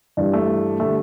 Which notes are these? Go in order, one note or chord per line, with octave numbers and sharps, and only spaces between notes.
G2 E3 G3 D4
A3
D3 G3 A3